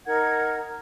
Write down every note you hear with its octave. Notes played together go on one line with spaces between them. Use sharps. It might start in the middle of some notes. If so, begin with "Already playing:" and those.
D#4 A#4 F#5 G#6